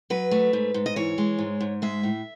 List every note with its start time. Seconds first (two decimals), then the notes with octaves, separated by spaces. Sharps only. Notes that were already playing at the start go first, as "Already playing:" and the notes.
0.10 F#3 B4
0.31 A3
0.53 G#2
0.74 G#2
0.86 D#5
0.96 E3 C#5
1.18 G#3
1.39 G#2
1.61 G#2
1.82 G#3 E5
2.03 A2